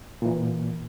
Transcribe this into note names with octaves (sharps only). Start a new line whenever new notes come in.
A#2 E3